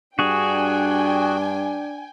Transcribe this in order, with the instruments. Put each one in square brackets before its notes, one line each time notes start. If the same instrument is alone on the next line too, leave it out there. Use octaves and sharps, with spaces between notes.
[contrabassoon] G2 [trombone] D4 [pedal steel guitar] F#4 G#4 [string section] G5 G#5